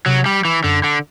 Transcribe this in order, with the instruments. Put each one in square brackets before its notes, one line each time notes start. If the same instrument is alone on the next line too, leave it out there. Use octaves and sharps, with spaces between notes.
[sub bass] C3 [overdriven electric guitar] F#3
[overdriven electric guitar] G3
E3
[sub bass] F#2 [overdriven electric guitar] D3
[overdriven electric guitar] D3